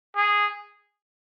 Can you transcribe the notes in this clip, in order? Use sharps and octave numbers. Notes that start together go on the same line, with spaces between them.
G#4